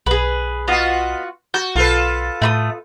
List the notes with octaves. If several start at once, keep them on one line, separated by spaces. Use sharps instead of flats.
B1 G#4 B4
B3 F4 F#4 D#5
F#4 G6
B1 F4 A4 B4
A2 A3 B5 D#6